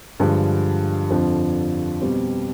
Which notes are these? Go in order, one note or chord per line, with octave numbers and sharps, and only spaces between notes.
G2 D3 F3 G#3
F2 D3 F3
B2 G3 C4